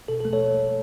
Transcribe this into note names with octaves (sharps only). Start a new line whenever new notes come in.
B2 A4
A4
A3
A4 C#5